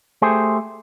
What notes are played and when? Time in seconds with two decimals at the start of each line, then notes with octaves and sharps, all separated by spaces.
0.22 A3 G4 G#4 C5